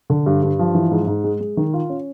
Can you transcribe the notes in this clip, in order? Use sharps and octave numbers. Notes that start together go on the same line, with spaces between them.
D3
G2
G2
F3
E3
G#2
G#2
G#3
G#3
D#3
F4
C#4